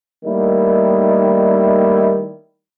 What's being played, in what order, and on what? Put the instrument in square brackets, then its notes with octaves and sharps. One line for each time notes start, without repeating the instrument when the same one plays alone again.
[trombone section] D#3 G3 A3 A#3 D#4 E4